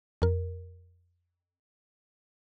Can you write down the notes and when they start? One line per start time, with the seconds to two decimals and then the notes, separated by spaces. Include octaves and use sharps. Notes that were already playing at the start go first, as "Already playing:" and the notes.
0.22 F2 A#4